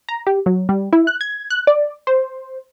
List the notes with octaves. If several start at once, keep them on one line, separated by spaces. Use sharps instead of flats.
A#5
G4
F#3
G3
E4
F#6
G#6
F#6
D5
C5